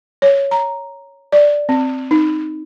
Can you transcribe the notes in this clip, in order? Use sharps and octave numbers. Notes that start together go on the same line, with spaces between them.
C#5
A#5
D5
C4
D#4